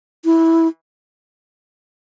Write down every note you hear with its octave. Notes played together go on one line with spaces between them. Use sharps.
E4